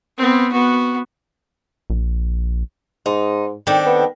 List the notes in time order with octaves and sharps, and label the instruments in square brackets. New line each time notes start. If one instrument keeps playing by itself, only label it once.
[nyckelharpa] B3 C4
B3 F#4
[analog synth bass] A#1
[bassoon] G#2 [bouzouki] D#4
[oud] D#3 [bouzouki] C4 D4 A4
[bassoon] B3